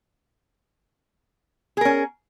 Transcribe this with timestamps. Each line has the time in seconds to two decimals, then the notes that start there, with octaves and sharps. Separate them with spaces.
1.77 G#4
1.81 A#4
1.85 C#4